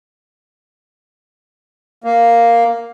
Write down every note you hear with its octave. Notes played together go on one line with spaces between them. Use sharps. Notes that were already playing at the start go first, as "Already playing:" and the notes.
A#3